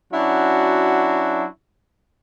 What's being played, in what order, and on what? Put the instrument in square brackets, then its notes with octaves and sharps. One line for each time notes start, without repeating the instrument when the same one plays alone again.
[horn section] F#3 C#4 D4 E4 F#4